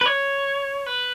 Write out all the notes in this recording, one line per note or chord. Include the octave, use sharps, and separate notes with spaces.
B4
C#5
B4